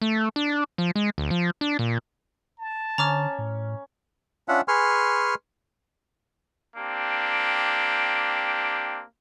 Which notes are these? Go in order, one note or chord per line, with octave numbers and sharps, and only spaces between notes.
A3
D4
F3
G#3
D2
F3
D4
A#2
A5
D3 C#4 A#5 D6 F6
A2
C#4 D4 F4 E5 F#5
G#4 B4 G#5 C6 C#6 F6
A#3 C4 D4 G4